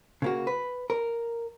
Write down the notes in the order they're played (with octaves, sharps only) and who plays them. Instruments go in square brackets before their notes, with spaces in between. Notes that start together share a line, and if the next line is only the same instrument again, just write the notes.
[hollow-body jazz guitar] C#3 A#3 F#4
B4
A#4